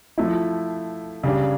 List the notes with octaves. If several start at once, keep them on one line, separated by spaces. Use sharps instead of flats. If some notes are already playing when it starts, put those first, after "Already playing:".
F3 A3 E4
C#3 G3 D4